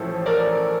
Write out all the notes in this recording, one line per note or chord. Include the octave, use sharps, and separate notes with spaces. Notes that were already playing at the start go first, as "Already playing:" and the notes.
Already playing: A1 A2 F3 A3 E4 A4
A#4 D5